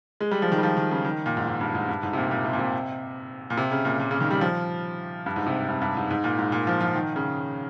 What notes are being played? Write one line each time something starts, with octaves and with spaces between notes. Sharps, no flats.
G#3
G3
F3
D#3
G3
F3
D#3
C#3
D#3
A#2
G#2
G#2
G2
G#2
G2
G#2
C3
A#2
A#2
C3
A#2
C3
A#2
C3
C#3
A#2
A#2
C#3
D#3
G3
F3
G2
G#2
C3
G2
G2
G#2
G#2
A#2
G#2
A#2
F3
F3
D#3
C#3